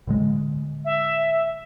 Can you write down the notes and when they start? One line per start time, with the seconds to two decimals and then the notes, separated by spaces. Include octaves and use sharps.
0.07 A2 D3 G#3
0.85 E5